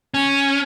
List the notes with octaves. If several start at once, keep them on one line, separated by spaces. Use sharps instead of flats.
C#4